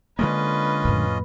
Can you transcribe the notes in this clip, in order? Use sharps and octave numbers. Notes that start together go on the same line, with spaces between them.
D3 G#3 A#3 C#4 F4 B4 D#5
F2 A2